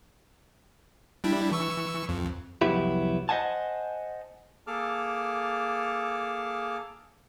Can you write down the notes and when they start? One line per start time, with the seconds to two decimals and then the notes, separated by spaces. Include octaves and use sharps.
1.24 G3 D4 E4
1.51 E3 C#6 E6
2.09 F2
2.61 C2 F2 F#3 B3 E4 G4
3.29 C5 D#5 E5 F#5 G#5 A5
4.67 A#3 G#4 A4 A5 D6 F6